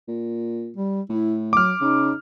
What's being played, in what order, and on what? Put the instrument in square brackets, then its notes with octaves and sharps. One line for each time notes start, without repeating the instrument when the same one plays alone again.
[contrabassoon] A#2
[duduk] G3
[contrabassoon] A2 [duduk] E4
[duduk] F#3 [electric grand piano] D6 F6
[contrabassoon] C#3 [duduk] D#4